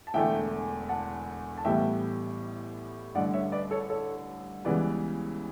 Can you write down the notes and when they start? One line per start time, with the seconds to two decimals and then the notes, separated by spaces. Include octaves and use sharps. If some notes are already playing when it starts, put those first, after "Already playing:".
0.07 A5
0.14 E1 E2 D3 A3 E5 G5
0.89 F#5 A5
1.57 A5
1.64 A1 A2 E3 G3 B3 E5 G5
3.15 A1 G2 D3 D5 F#5
3.34 C#5 E5
3.52 B4 D5
3.71 A4 C#5
3.90 A4 C#5
4.65 C#2 C#3 E3 G3 B3 B4 D5